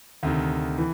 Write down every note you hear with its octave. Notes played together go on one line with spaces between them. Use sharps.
D2 C3 D#3
E3